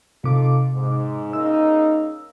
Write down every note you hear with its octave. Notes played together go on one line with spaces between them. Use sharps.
C3 D#4 F4 A4 D6
G#2
C#3 A#3 D#4 E6